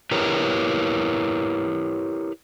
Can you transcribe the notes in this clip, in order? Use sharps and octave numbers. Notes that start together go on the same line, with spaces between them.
E4 G4 A#4 B4 C#5